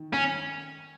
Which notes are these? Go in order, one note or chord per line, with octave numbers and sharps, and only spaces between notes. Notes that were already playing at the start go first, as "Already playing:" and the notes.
Already playing: D#3
C#4